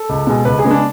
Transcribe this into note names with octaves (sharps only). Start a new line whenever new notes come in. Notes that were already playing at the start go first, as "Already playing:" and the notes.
Already playing: A4
C#2
B2 G#3
C#2 B4
G#4
C#3 G#3 B3
D4